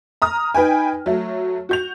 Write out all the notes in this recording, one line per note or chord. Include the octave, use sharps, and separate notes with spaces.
A#5 D#6 F6
D#4 B4 G5 G#5
F#3 A3
F#4 G6 F7